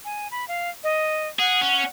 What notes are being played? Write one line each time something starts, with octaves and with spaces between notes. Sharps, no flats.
G#5
B5
F5
D#5
G#4 F#5
C#4